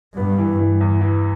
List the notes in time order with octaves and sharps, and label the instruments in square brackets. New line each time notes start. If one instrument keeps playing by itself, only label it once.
[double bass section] G2 [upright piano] B3
[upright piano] E3
E3
E2
E3